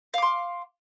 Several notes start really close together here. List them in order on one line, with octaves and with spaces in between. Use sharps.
F5 D6 C6